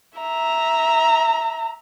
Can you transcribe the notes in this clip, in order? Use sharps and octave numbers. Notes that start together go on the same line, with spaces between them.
E5 A#5